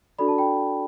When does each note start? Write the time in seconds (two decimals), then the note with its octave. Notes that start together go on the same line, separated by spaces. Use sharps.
0.18 D4 F#4 A4 D5 B5
0.28 A5
0.38 G5 B5